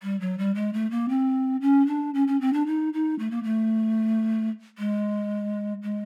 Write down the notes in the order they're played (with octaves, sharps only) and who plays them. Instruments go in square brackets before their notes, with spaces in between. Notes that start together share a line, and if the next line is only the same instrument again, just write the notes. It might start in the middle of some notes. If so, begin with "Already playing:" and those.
[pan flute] G3
F#3
G3
G#3
A3
A#3
C4
C#4
D4
C#4
C#4
C4
D4
D#4
D#4
A3
A#3
A3
G#3
G#3